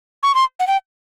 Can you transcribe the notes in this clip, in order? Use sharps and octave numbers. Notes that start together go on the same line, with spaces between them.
C#6
C6
F#5
G5